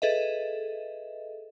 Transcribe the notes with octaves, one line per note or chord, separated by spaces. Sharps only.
G#4 A4 B4 D#5 E5